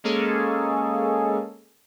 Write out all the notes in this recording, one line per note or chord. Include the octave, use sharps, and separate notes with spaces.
G#3 A#3 C#4 G#4 A4